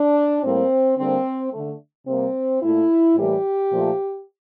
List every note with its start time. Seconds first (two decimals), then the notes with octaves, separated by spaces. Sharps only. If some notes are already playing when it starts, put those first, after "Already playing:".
Already playing: D4
0.43 A2 G3 A#3 C4
0.98 D3 G3 A#3 C4
1.53 D3 A3
2.07 C3 G3 A#3 C4
2.62 A#2 A3 E4
3.16 A2 E3 G3 A#3 G4
3.71 A#2 F3 A3